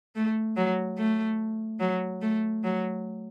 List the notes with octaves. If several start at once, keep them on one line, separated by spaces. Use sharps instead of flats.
A3
F#3
A3
F#3
A3
F#3